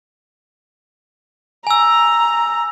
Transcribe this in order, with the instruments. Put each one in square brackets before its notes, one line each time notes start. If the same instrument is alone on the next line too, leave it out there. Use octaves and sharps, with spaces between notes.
[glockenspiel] G#5 E6 [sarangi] A#5